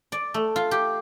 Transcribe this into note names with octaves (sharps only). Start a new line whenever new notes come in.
D5
A3
F4
G4